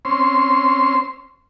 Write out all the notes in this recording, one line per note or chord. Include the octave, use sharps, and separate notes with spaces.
C4 C#4 C6